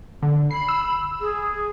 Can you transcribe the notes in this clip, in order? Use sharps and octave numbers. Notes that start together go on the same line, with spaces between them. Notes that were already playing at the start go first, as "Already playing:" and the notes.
D3
B5 C7
E6
G#4